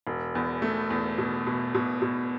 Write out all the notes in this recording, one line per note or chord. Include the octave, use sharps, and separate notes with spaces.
E1
E2
A3
E2
B2
B2
B2
B2